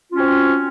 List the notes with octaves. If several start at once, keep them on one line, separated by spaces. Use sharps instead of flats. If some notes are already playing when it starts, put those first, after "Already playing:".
C4 C#4 F4 F#4